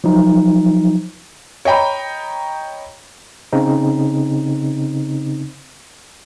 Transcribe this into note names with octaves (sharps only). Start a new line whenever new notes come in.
F3 F#3 D#4
C#5 D#5 G5 A#5 B5
C#3 C4 D#4